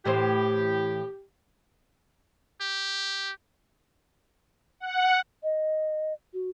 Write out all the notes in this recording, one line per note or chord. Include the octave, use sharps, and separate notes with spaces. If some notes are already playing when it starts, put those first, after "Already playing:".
A2 E3 G4 C5
G4
F#5
D#5
F#4